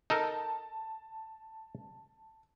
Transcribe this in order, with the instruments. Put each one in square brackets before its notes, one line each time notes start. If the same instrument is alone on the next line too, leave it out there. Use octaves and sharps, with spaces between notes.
[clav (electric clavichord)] D#4 A4 A#4 [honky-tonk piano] A5